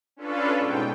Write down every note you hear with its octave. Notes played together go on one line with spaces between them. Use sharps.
C#4 D4 F4 A4 B4
G#2 B2 G5